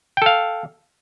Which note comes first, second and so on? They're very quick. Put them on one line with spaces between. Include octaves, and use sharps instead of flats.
G5 A4 F5